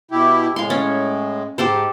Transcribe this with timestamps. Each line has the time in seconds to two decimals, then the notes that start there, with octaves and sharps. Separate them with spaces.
0.11 B2 E4 G4
0.56 A2 G#3 F5 C6
0.70 C#4
1.58 G#2 G4 A4 C5